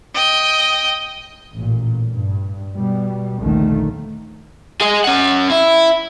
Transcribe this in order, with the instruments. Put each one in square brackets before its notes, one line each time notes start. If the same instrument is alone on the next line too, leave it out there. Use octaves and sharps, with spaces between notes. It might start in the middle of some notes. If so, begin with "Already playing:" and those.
[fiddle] D#5 G5
[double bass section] A1 A#2
G2
B2 G3
A#1 D#2 D3 D#3 A3
[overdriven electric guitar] G#4 D#5
C#4 F#5
E4